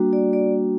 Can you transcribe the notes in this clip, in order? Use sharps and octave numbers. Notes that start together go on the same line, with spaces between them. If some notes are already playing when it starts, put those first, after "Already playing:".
Already playing: G3 A#3 D4 F#4
D5
D5